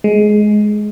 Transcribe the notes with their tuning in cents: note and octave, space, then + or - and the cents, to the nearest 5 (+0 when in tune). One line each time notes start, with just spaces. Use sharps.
G#3 +15